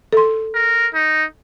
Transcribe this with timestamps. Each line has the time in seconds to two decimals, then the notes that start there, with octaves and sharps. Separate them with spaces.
0.13 A4 C6
0.55 A#4
0.95 D#4